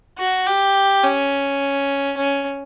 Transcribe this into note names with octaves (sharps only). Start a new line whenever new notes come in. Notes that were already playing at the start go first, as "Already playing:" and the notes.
F#4
G4
C#4
C#4